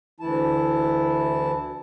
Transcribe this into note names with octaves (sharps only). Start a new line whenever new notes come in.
D2 E3 E4 A5